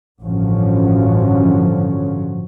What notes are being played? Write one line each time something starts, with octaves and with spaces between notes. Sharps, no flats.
A1 G2 D3 F3 F#3 C#4